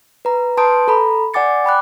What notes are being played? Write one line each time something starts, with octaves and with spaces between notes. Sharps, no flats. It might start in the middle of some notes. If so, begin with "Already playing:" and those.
B4 A#5
B4 A5 C6 D#6 G6 D7
A4 A#5 B5
D5 F#5 G#5 D6 A6 C#7
G5 B5 D6 F#6